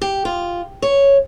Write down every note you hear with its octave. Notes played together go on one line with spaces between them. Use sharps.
G4
F4
C#5